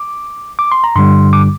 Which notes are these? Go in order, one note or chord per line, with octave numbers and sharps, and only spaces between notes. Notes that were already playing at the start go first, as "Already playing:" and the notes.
Already playing: D6
D6
C6
A#5
G2 D3 G3 C6
D6